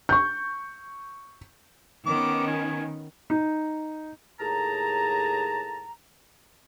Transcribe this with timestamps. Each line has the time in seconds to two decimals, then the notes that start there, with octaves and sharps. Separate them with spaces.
0.09 C#6 G6
2.06 D#3 B3 C#4 D6
2.48 G#5
3.30 D#4
4.39 D#2 A2 G#4 A5 A#5